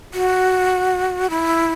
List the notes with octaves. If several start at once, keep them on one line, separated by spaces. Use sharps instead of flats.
F#4
E4